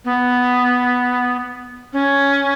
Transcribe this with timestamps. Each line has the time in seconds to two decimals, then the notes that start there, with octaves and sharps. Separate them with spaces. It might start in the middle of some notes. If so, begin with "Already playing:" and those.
0.05 B3
1.93 C#4